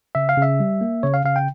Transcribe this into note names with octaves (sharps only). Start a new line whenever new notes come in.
C#3 E5
F5
C#3 E5
G3
A#3
C#3 C#5
F5
C#3 F5
G5